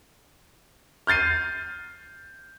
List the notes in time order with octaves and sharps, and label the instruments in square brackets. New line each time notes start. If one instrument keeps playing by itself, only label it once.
[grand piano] F6 G6 A6 C7 D#7